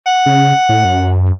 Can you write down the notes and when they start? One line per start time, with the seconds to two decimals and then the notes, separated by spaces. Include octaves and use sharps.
0.06 F#5
0.26 C#3
0.69 A2
0.85 F#2